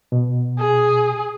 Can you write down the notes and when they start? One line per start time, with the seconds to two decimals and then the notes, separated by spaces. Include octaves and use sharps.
0.12 B2
0.59 G#4